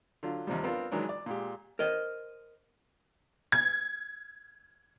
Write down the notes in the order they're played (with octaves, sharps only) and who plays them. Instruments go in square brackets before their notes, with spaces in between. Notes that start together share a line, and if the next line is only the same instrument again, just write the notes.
[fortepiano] D3 F#3 F4
D#2 C3 F3 G3
B3 C4 D4 F4 A#4
D#3 E3 F#3 G#3 D4
D5
A#2 G#3 G4
[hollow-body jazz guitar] A#4 C5 D#5
[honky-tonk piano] G#6